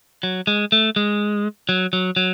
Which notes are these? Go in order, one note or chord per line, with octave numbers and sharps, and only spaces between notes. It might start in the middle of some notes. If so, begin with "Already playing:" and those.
F#3
G#3
A3
G#3
F#3
F#3
F#3